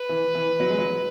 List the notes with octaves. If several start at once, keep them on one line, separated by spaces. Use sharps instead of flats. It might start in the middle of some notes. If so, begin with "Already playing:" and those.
Already playing: B4
E3
E3
F#3
G#3
F#3